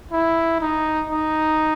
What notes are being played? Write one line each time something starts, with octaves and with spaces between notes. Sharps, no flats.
E4
D#4
D#4